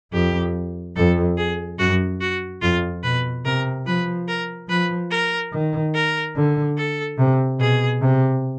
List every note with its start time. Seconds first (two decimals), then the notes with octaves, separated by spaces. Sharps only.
0.12 F2 G4
0.96 F2 A4
1.37 G#4
1.79 F#2 F#4
2.21 F#4
2.62 F2 F4
3.03 B2 B4
3.45 C3 A#4
3.86 F3 B4
4.28 A#4
4.69 F3 B4
5.11 A#4
5.52 D#3
5.94 A#4
6.36 D3
6.77 A4
7.18 C3
7.59 B2 G#4
8.02 C3